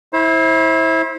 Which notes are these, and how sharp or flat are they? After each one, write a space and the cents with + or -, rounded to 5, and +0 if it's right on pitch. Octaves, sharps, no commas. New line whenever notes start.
E4 -20 C5 +25